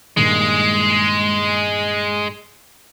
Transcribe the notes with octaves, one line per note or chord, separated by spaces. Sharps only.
G2 A#2 D#3 G#3